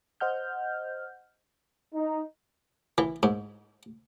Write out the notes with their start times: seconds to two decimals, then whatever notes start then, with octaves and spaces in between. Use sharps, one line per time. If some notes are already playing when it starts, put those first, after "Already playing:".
0.20 C5 D#5 F#5 F6 G6
1.94 D#4
2.98 E3
3.23 G#2